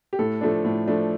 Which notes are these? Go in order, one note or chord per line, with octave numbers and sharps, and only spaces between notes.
G4
A2 A4
F3 A3 D4
A2
F3 A3 D4